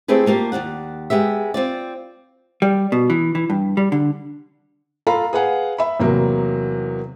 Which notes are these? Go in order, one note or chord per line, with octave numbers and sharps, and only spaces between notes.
A3 C4 E4 G4 G#4 B4
A3 A#3 F4 G4
D#2 F3 D5 F#5
G#3 B3 G4 E5
C4 F4 D5
G3
B2
E3
E3
G2
G3
D3
F4 A4 F5 A#5 B5
G#4 B4 F5 F#5 G#5
E5 B5
E2 C3 F#3 A#3